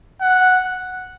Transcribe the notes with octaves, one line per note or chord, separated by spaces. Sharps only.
F#5